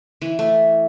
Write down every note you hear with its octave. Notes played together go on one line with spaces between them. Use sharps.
E3
A3